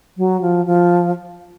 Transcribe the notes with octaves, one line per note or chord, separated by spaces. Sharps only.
F#3
F3
F3